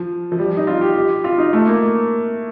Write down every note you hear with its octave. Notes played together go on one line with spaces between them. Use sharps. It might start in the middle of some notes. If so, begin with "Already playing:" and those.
Already playing: F3
F3
G3
D#4
F4
G4
G4
F4
D#4
A3
A#3